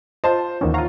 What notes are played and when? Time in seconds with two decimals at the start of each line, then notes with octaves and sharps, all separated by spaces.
0.24 F4 C5 D#5 A5 C6
0.61 A1 D#2 D#3 C#4
0.74 F4 C#5 F5 F#5 A#5